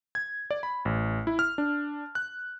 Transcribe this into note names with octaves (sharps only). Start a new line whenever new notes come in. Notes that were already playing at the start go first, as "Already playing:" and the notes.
G#6
D5
B5
A1
E4
F6
D4
F#6